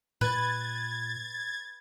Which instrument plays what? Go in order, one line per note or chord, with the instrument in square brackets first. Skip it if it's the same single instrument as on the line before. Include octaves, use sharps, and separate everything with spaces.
[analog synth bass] A#2 [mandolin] B4 [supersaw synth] G#6 A6